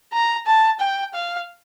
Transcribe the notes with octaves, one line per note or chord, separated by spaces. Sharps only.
A#5
A5
G5
F5